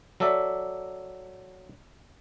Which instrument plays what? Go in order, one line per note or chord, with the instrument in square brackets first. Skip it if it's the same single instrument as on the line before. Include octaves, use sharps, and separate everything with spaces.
[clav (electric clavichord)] F#3 A4 D5 E5